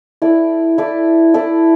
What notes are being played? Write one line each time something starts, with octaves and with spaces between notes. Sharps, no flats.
E4 A4 D5
E4 A4 D5
E4 A4 D5